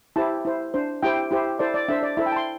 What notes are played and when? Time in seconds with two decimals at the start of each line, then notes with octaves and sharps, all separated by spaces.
0.16 E4 G4 C5 A5
0.45 E4 C5
0.74 D4 C5
1.03 E4 G4 C5 G5
1.31 E4 G4 C5
1.59 E4 A4 C5 D5
1.74 D5
1.88 D4 A4 C5 E5
2.03 D5
2.17 E4 A4 C5 E5
2.26 G5
2.32 A5
2.36 C6